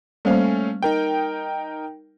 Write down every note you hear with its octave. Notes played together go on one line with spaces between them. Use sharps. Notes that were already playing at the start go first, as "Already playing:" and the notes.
G3 A3 A#3 C#4 C5 F5
D#4 A#4 G5